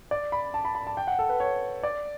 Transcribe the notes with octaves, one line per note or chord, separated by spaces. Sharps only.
D5
B5
A5
B5
B5
A5
G5
F#5
A4
B4
C#5
D5